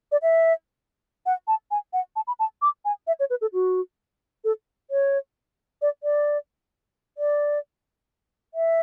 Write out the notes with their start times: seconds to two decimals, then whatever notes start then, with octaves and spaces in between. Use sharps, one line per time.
0.12 D5
0.22 E5
1.26 F#5
1.48 A5
1.71 G#5
1.93 F#5
2.16 A5
2.27 B5
2.39 A5
2.62 D6
2.85 G#5
3.07 E5
3.20 C#5
3.30 B4
3.41 A4
3.53 F#4
4.44 A4
4.91 C#5
5.82 D5
6.03 D5
7.18 D5
8.54 E5